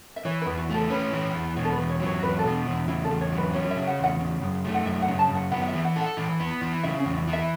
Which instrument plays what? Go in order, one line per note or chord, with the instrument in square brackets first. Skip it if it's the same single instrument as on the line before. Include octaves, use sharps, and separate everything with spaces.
[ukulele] E5
[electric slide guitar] E3 [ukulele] C#5
[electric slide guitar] E2 [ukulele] B4
[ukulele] F#4
[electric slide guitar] A3 [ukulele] A4
[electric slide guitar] C#4 [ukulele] B4
[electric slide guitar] E3
E2
[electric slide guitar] B2 [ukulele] C#5
[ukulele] A4
B4
[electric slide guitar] E2
[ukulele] C#5
[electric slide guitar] F#3
[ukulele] C#5
[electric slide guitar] E2 [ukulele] B4
[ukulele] A4
[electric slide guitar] B2
[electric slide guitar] E2 [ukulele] E4
[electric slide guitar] C#3 [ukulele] E4
[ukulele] A4
[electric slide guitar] E2
[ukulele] C#5
[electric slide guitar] F#3
[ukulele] B4
[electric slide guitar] C#4 [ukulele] C#5
[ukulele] E5
[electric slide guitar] C#3
[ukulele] F#5
[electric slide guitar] E2 [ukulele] F#5
[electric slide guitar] C#3
F#2
A3
[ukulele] F#5
[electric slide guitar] F#2 [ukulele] E5
[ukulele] F#5
[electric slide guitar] C#3
[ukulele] A5
[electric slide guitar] F#2 [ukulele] F#5
[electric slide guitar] B3 [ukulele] F#5
[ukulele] F#5
E5
[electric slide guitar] E3
[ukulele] F#5
[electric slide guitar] A4
[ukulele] F#5
[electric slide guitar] E3
B3
E3
[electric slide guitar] C#3 [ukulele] E5
[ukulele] C#4
[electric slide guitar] E2
[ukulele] E4
[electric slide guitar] E3
[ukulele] E5